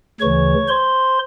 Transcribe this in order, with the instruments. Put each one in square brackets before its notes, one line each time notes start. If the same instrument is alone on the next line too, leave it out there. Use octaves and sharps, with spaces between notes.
[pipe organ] D2 C#3 E3 C#5 C#6
C5 C6